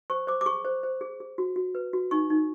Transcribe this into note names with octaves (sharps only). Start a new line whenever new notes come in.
C5 C#6
C5 D6
D6
G#4 C#6
C5
C5
G#4
G#4
F#4
F#4
B4
F#4
D#4 C#6
D#4